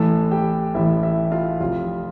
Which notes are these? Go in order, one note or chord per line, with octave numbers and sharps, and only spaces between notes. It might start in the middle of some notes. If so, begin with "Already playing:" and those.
Already playing: A1 A2 E3 A4 A5
G4 G5
A1 A2 E3 E4 E5
E4 E5
F4 F5
F1 F2 C3 F4 F5